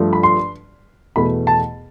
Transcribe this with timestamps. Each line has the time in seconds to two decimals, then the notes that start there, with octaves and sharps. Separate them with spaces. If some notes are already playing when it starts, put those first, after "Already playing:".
Already playing: G2 F3 A3
0.13 B5
0.23 C6
1.16 E2 B2 A3 B5
1.47 A5